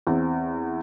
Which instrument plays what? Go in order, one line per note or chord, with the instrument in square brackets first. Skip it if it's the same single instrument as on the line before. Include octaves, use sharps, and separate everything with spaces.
[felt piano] E2 C4